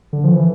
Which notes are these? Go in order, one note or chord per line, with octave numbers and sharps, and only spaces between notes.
D3
F3
E3